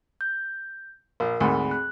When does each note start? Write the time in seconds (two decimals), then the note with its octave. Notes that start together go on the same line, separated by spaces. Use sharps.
0.21 G6
1.20 A#1 A#4
1.41 D2 G#2 C4 G#4 B5
1.71 F#6